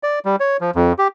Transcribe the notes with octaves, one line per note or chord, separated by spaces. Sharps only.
D5
G3
C#5
F3
F2
G4